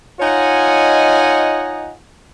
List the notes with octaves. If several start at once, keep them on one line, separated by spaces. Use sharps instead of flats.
D#4 F4 C#5 D#5 F#5 G#5